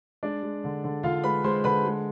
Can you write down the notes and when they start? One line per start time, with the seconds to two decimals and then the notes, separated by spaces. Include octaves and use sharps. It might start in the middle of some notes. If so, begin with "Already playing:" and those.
0.23 G#3 D4 D5
0.43 G#3
0.64 D3
0.84 D3
1.03 D3 F4 F5
1.24 G#3 B4 B5
1.44 G#3 C5 C6
1.64 D3 B4 B5
1.85 G#3